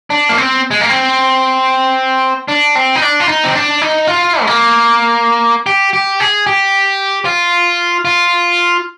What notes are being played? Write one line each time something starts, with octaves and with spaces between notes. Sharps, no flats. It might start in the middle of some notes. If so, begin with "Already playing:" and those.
D4
A#3
C4
G#3
A#3
C4
D4
C4
D#4
D4
F4
D#4
C4
D4
D#4
F4
G#3
A#3
G4
G4
G#4
G4
F4
F4